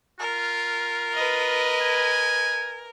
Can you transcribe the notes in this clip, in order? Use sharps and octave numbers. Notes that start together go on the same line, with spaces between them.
F4 A#4
B4 D#5
G#5